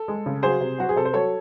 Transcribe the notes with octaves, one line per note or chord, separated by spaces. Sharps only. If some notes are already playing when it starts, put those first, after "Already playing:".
Already playing: A4
G#3
C#3
F#3 G#4 C5
C3
F#3 F#4
G#4
C3 A4
C5
F#3 A4 C#5